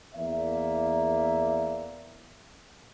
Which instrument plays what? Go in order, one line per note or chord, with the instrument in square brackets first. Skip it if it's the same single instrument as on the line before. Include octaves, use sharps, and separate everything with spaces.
[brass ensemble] E2 A#3 D5 E5